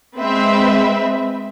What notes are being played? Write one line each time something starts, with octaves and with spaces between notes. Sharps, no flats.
G#3 C4 B4 E5